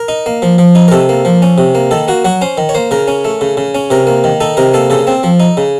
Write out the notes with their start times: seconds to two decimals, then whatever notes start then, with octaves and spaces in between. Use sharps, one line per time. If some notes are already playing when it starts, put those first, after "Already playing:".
Already playing: A#4
0.08 D#4
0.26 A#3
0.42 F3
0.58 F3
0.75 D#4
0.88 A#4
0.92 C3 A4
1.09 A#3
1.25 F3
1.42 C#4
1.58 C3
1.75 A#3
1.91 D#3 A4
2.08 A#3 F#4
2.25 F#3 F#4
2.41 C#4 C5
2.58 D#3
2.69 C#5
2.75 A#3 C5
2.91 C#3 A#4
3.08 C#4
3.25 A3
3.41 C#3
3.57 C#3
3.75 C#4
3.90 C3 A#4
4.07 A#3
4.24 D#3
4.40 D#4 A4
4.57 C3 A#4
4.74 A#3 A4
4.90 C#3 A4
5.07 C4
5.23 F3
5.40 D#4
5.57 C#3